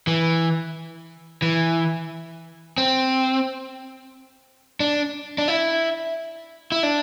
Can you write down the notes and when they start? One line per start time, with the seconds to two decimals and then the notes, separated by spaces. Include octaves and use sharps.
0.07 E3
1.42 E3
2.78 C4
4.80 D4
5.38 D4
5.48 E4
6.72 E4
6.83 D4